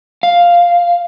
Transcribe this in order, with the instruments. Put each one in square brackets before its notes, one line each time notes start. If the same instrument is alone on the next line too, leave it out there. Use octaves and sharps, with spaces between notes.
[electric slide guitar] F5